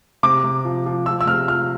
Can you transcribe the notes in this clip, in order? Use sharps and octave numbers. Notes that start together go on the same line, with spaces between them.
C3 D6
C3
F3
F3
F3 E6
E6
C3 F6
F3 F6